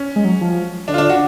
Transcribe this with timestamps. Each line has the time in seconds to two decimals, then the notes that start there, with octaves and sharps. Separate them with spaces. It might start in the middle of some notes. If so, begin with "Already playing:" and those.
Already playing: C#4
0.16 G#3
0.25 F#3
0.41 F3
0.88 D3 D4
0.94 F4
0.98 D4
1.09 F#4